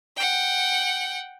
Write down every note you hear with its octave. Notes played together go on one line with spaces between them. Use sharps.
F#5 G5